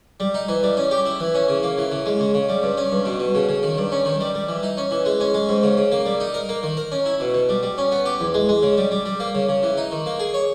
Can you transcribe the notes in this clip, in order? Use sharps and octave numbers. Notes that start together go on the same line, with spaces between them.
G3
D#4
E3
G3
C#4
G4
E4
E3
C#4
C#3
A#3
E3
C#3
G#3
C#3
C#3
G3
G2
C#4
G2
B2
B2
C#3
C#3
D#3
G2
C#4
D#3
G3
G3
E3
D#4
C#4
E3
G#3
C#4
G#3
G#2
C#3
C#3
A#3
G3
D#4
A#4
A#3
D#3
A#4
C#4
E4
B2
B2
G3
G3
C#4
B3
G4
E2
G#3
G#3
C#3
G3
G3
G3
A#3
C#3
C#3
E3
D#4
D#3
A#3
G#4
C#5